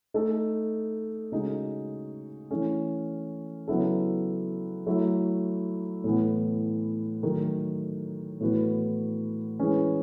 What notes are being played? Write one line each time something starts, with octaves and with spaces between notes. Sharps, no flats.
A3 D#4 A4
C#3 G#3 D#4 F#4
E3 A3 C#4
C#3 F#3 B3 E4 A4
F#3 A3 E4
A2 E3 B3
D#3 F#3 A3
A2 E3 B3 F#4 B4
E3 G#3 C#4 G#4 B4